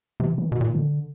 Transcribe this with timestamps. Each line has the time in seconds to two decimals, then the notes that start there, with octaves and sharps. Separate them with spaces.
0.20 C3 E3
0.38 E3
0.47 B2 D#3
0.61 A#2
0.75 D3